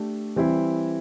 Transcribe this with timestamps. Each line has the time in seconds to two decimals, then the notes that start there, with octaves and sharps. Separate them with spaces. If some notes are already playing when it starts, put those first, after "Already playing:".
Already playing: A3 D4 G4
0.36 E3 G3 C4 E4